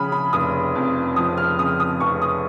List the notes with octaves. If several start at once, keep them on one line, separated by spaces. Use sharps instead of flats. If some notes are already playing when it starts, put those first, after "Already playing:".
Already playing: C#3 F3 B5 D#6 F6
B5
F1 D#6
F2
F3 D#6
F6
C#3 D#6
D#6
F1 C#6
D#6